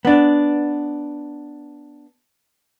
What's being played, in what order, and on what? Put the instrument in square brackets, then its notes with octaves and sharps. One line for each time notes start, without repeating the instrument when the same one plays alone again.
[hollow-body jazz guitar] B3 D4